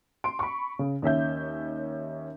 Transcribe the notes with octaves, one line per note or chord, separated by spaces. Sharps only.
C6 D7
B5 C#6
C#3
D#2 C#4 E5 G6